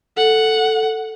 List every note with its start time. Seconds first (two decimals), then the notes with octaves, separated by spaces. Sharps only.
0.17 A4 F#5